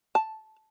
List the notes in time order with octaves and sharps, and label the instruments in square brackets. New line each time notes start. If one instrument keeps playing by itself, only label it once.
[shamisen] A5